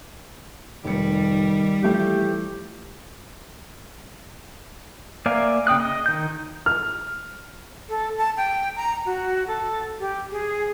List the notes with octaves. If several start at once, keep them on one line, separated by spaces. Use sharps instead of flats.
F1 D#3 G3 C#7
E3 F3 A3 G4
A#3 D5 E5 F5 G#5
C#3 G5 D#6 F#6
D#5
D#3 G6
F6
A4
A5
G5
A#5
F#4
A4
G4
G#4